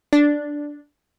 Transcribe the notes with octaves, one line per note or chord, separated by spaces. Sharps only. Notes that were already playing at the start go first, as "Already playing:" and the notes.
D4